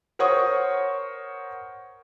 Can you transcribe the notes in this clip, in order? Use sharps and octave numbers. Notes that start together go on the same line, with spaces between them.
A#4 C5 C#5 F#5 C#6 D#6